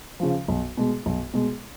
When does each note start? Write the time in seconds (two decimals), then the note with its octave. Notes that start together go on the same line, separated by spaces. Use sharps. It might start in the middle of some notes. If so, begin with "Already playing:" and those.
0.20 C#3 F3
0.48 B1
0.77 B2 G#3
1.06 B1
1.34 B2 G#3